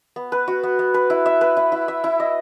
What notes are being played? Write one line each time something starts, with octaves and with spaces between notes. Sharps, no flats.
B3
B4
F#4
B3
B3
B4
E4
E5
B4
E4
E4
E5
E4
D#5